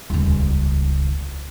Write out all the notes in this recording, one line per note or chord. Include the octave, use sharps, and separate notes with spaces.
D#1 C#2